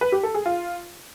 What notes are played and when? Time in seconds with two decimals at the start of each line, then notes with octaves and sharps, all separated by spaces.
0.01 B4
0.12 G4
0.23 A4
0.34 G#4
0.46 F4